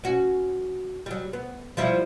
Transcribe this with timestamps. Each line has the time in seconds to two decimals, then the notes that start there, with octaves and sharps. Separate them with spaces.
0.04 C#4 F#4
1.06 F#3 G3
1.33 B3
1.77 F3 G3 E4